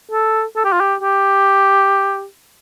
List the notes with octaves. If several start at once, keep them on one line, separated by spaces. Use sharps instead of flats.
A4
A4
G4
F4
G4
G4